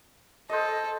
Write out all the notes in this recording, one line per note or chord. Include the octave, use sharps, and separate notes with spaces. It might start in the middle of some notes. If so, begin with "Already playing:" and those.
A4 C5 D#5